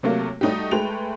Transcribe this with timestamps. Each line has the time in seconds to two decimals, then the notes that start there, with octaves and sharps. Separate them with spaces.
0.03 C3 F#3 A3 A#3
0.41 G3 A3 D#4 F#4 G4
0.71 G#3 A3 B4 G5 F7